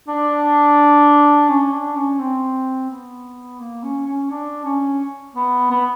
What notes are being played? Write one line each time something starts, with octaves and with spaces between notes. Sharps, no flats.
D4
C#4
D4
C#4
C4
B3
A#3
C#4
C#4
D4
C#4
B3
B3